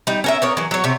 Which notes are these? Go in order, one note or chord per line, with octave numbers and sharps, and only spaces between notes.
G3 D#4
C#4 A#4 E5
B3 A#4 C#5
E3 F#3
F#3 C#5
C3 C#5